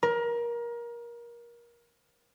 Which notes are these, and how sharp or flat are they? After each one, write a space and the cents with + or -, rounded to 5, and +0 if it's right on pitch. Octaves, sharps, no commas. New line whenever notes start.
A#4 +25